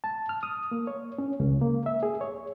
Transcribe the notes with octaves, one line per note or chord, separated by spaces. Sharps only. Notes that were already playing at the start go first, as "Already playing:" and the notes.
A5
F6
D#6
A#3
C#5
C#4
C#2
A#3
E5
G#4
C#5